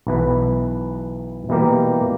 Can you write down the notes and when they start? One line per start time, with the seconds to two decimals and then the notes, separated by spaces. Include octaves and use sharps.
0.07 B1 E3 B4
1.49 B2 E3 G3 A#3 G4 A#4